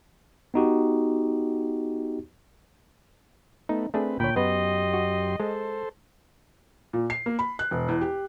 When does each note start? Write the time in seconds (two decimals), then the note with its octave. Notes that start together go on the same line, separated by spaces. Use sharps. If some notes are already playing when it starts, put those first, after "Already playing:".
0.54 B3 D#4 F#4 G4
3.69 A3 B3 D#4
3.94 A3 C4 D4 G#4 B4
4.20 D2 A#2 C#5 G5 B5
4.36 F#2 B3 G4 B4 D#5 C6
4.94 F#4
5.40 G#3 A4 C5
6.93 A#2
7.10 C7
7.26 A#3
7.39 B5
7.59 F#6
7.71 E1
7.88 E2
8.01 G4